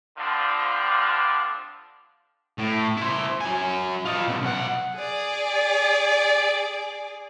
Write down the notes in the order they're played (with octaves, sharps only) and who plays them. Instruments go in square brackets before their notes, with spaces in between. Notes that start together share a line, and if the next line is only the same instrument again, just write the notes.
[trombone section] D3 F3 G3 C4 D4 F4
[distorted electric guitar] A2
E4 C5
F#3 G#5
F4 D#5
B2 C#4
B1 F#5
[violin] G#4 D5